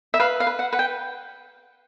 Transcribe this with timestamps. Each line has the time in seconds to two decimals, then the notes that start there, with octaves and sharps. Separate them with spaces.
0.14 E5
0.20 B4 F5
0.40 F5
0.47 B4
0.59 F#5
0.72 B4 F#5
0.79 G5